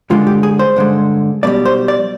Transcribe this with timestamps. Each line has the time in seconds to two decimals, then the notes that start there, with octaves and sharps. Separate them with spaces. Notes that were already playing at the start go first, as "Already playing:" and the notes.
0.10 G2 D3 G#3 F4
0.27 G4
0.43 G#4
0.59 C5
0.76 G2 D3 G#3
1.43 B1 B2 G3 D5
1.66 C5
1.88 D5